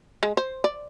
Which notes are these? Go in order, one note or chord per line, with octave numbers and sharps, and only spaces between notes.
G#3
C5
D5